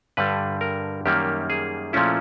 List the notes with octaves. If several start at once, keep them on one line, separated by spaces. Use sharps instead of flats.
G2 D3 G3 B4
A#4
F#2 D#3 G3 A#3 G4
G#4
A#2 F3 A3 C#4 E4